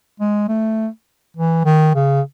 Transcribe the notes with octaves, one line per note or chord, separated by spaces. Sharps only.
G#3
A3
E3
D#3
C#3